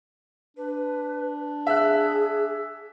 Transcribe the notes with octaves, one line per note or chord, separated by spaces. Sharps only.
D4 B4
G#4 E5 E6 F#6